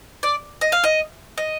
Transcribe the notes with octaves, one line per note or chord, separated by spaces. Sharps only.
D5
D#5
F5
D#5
D#5